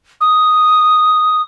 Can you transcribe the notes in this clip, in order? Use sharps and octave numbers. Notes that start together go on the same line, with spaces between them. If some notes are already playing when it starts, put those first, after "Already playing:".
D#6